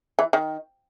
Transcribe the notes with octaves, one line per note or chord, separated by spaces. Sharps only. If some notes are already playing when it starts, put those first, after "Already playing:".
E3
D#3